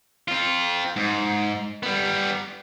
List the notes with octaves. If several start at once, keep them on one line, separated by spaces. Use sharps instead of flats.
C4 F4
G#2
G3 B3